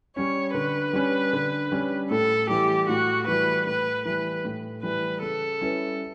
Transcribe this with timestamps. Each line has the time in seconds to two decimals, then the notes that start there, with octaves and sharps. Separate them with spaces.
0.16 G3 C#4 C#5
0.54 D3 B4
0.93 G3 C#4
1.33 D3
1.72 G3 C#4
2.10 A2 A4
2.49 E3 G3 G4
2.88 A2 F#4
3.27 E3 G3 B4
3.66 A2 B4
4.05 E3 G3 B4
4.45 A2
4.83 E3 G3 B4
5.22 C#3 A4
5.61 G3 C#4 E4 B4